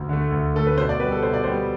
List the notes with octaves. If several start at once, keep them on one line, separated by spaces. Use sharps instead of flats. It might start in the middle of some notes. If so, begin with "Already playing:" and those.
Already playing: D2
D3 A3
D2
D3 A3 A4
B4
B2 C5
D5
G3 B3 B4
A4
B2 C5
D5
G3 B3 C5